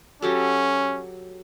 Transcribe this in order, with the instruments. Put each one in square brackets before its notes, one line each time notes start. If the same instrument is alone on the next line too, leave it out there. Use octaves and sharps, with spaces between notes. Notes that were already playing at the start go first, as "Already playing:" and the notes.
[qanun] F#3 G4 A4 [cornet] C#4